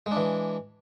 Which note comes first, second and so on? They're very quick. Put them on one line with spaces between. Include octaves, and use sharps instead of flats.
G#3 D4 E3